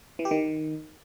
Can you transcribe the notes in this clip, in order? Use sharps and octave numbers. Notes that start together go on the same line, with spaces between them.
E3
G4
D#3